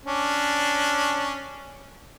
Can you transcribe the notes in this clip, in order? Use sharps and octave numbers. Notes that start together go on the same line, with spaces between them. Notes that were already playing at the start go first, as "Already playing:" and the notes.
C#4 D4